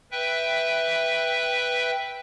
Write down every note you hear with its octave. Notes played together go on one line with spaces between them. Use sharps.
B4 E5 G5